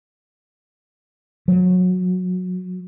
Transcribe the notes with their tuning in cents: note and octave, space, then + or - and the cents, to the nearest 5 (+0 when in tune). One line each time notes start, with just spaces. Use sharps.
F#3 -20